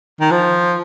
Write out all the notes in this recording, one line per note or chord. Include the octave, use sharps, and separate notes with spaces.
D#3
F3